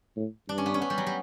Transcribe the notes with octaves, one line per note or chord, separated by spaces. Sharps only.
A2
G2 D4
C#4
B3
C#4
B3
G3
F#3
G3